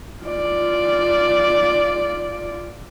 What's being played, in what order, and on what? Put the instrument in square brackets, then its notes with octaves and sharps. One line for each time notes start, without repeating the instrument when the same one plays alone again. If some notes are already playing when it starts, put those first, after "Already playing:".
[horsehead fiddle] F4 D5